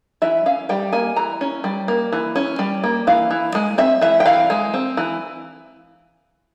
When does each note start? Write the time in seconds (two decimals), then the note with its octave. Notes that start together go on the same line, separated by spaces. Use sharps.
0.22 E3 E5
0.46 C#4 F5
0.69 G3 G5
0.93 A#3 G#5
1.16 E3 A#5
1.41 C#4
1.64 G3
1.88 A#3
2.12 E3
2.36 C#4
2.59 G3
2.84 A#3
3.07 E3 F5
3.31 E3
3.55 G#3
3.78 C4 E5
4.01 E3 E5
4.20 G5
4.25 E3 F5
4.50 G#3
4.74 C4
4.97 E3